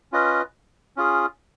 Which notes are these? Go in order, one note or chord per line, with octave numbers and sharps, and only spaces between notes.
C#4 F4 B4 D#5
C#4 F4 G#4